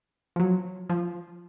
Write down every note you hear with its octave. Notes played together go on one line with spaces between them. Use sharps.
F3
F#3
F3